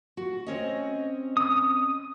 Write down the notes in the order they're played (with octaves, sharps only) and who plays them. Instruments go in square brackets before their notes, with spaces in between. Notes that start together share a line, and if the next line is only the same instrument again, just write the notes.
[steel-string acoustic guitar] F#4
C4 C#4 D#5
[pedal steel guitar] D#6